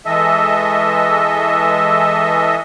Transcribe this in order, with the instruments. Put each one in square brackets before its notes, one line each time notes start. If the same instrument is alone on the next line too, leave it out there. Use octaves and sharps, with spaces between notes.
[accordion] E3 G#3 A4 D#5 E5